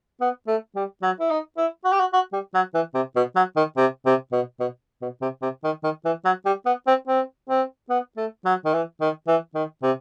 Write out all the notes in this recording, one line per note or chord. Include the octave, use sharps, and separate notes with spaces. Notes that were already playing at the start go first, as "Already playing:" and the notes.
B3
A3
G3
F#3
E4
D#4
E4
F#4
G4
F#4
F#4
G3
F#3
E3
C3
B2
F#3
D#3
C3
C3
B2
B2
B2
C3
C3
D#3
D#3
E3
F#3
G3
B3
C4
C4
C4
B3
A3
F#3
D#3
E3
D#3
E3
D#3
C3